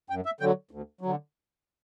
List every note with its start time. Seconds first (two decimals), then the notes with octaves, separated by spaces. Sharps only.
0.10 F#2 G5
0.26 E5
0.40 D3 F#3 G5
0.71 D2
1.01 D3 F#3